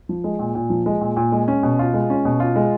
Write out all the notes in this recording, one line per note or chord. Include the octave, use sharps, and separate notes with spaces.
F3
G#3
A#2
A#2
F3
G#3
A#2
A#2
G#3
C#4
B2
F4
G#3
C#4
B2
F4
G#3